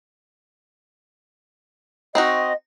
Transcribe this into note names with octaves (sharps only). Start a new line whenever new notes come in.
C4 D#4 F#4 D#5